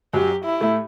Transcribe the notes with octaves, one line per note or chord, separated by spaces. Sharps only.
F#2 F#3 G4
E4
A2 A3